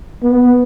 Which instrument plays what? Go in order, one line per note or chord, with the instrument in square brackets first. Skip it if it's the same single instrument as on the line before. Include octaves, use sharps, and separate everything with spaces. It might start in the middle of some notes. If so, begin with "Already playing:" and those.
[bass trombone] B3